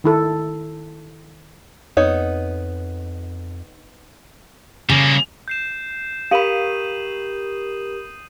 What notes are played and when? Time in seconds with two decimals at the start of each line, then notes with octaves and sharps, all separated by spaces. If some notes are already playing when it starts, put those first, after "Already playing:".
0.04 D#3 E4 A4
1.97 F2 B3 D#4 C#5
4.89 C#3 G3 A#3
5.48 G6 C7 E7
6.31 G4 A#4 F5 B5 D#6 D#7 F#7